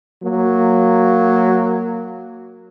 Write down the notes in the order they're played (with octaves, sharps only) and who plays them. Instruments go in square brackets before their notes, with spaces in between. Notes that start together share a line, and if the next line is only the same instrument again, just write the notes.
[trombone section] F#3 A#3